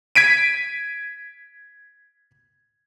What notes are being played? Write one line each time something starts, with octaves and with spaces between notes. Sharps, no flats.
G#6 B6 D7 D#7